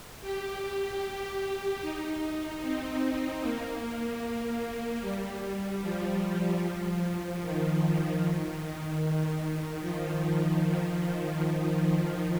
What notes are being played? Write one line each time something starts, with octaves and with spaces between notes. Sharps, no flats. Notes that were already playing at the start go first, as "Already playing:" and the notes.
G4
D#4
C4
A#3
G3
F3
F3
D#3
F3